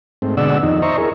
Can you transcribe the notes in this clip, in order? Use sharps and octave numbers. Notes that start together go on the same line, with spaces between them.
G#2 A3 C4
B2 D3 G#3 D5 F#5 E6
F2 D#3 D#4
C5 D#5 E5 A#5 C#6
E4 G#4 A#4